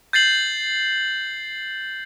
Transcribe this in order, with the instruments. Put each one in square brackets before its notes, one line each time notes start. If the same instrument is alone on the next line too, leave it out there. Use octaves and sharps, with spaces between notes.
[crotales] G6 A6 C7 F#7